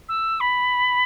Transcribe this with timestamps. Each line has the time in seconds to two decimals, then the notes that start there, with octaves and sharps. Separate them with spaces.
0.08 E6
0.40 B5